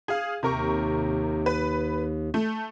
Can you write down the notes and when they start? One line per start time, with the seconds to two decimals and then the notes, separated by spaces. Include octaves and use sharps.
0.08 G#4 F5
0.43 D#2 C3 A#4 C#6
1.46 B4
2.34 A3